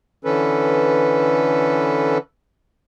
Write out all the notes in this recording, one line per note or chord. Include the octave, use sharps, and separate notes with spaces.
D3 E3 C#4 A4 B4